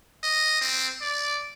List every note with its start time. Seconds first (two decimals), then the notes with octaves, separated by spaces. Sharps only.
0.23 D#5
0.61 C4
1.01 D5